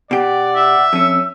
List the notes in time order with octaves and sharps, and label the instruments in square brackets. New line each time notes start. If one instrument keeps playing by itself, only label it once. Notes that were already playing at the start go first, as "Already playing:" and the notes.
[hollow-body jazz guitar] B2 G4 [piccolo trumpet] D5 [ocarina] F#5
[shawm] E5
[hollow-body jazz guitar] F2 C#4 [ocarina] E6